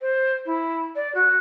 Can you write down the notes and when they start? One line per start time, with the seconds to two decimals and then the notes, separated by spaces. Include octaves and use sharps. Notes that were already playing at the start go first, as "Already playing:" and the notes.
0.01 C5
0.46 E4
0.95 D5
1.15 F#4